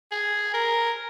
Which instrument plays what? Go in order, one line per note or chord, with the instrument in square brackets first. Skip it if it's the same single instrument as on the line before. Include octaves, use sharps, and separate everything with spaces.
[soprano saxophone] G#4
A#4